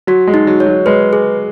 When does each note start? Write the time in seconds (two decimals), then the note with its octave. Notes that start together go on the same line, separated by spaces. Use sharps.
0.07 F#3 F#4
0.27 G#3
0.34 D#4
0.47 F#3
0.60 C#5
0.66 F#3
0.86 G#3 B4
1.13 G#4